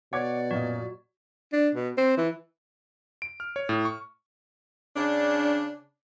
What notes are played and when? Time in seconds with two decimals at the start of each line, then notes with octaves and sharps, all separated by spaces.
0.13 B2 C#5 D5 F#5 D6 G#6
0.51 F#2 A#2 F#4 D#5
1.53 D4
1.75 B2
1.98 C4
2.17 E3
3.22 D7
3.40 F6
3.56 C#5
3.69 A2
3.85 C#6
4.96 C#3 D4